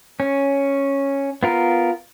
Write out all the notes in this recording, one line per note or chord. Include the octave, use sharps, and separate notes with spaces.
C#4
B3 F4 A#4